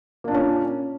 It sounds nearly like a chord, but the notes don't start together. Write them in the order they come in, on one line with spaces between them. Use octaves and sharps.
A#3 D4 A#2 C#4